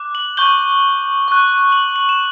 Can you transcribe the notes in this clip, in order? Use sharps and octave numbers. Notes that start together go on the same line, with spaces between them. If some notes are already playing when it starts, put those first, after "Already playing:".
Already playing: D6 F#6
F#7
C#6 G6 G7
C#6 F#6
F#7
F#7
E7